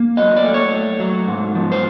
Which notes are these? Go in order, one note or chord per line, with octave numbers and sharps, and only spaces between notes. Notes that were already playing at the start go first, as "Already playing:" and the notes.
Already playing: A#3
F#3 D#5
D5
A3
C#5
A3
F#3
G#2
F3
C5